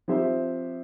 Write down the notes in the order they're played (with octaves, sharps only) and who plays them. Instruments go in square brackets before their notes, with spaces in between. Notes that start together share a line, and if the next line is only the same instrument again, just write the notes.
[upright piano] F3 C4 G4 C5 E5